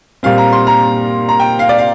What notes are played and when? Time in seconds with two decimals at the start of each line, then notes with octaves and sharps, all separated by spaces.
0.23 A#2 G3 C4 F5
0.38 A#5
0.53 C6
0.67 A#5
1.29 A#5
1.40 G5
1.59 F5
1.69 D5
1.78 F5